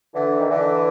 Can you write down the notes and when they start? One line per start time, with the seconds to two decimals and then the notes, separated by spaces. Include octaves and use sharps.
0.13 D3 E3
0.40 D#3
0.51 D3 E3